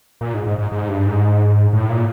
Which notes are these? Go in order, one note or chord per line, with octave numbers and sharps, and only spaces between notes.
A#2
G#2
G#2
G#2
G#2
G2
G#2
A2
A#2